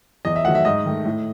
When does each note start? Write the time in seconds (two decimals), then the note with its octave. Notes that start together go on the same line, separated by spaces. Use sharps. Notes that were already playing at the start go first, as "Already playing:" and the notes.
0.25 E2 D#5
0.36 E5
0.45 D#3 F#3 A3 F#5
0.55 E5
0.65 G#2 D#5
0.86 D#3 A3
1.05 A2